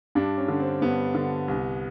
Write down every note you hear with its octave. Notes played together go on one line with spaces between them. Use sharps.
G2 D4
C#4
D3
C4
G2 B3
D3
C2